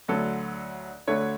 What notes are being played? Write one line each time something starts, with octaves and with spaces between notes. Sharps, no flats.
D2 D3 F#3 A4
D2 D3 A3 C#5